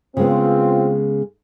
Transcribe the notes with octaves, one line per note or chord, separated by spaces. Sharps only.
C#3 G#3 B3 C4 F4